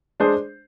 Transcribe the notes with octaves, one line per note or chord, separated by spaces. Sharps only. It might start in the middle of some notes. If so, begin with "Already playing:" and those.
G#3 D4 G#4 C5